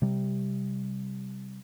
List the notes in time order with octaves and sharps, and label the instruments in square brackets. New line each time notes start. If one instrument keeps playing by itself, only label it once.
[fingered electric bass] C3 G3